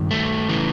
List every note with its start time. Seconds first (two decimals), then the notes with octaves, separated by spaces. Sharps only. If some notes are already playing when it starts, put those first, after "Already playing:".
Already playing: G2 D#3
0.11 A3
0.49 C#3 E3